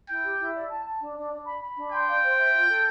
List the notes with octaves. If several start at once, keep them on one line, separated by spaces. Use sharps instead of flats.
E4 G5
G4
E4
D5
A5
A5
D4
D4
D4
B5
B5
D4
G5 C6
F5
C5
E5
F4
A4